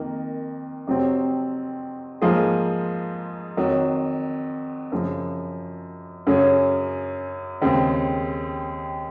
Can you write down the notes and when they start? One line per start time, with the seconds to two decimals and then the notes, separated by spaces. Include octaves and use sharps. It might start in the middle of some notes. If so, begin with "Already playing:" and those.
Already playing: F2 D#3 A#3
0.87 F2 C3 F#3 C4
2.22 G#2 F3 A#3 F4 G#4
3.57 F2 D#3 F#3
4.92 F#2 C#3 F3
6.27 F#2 C#3 F#3 C#4 G#4
7.62 D#2 C#3 G#3 C4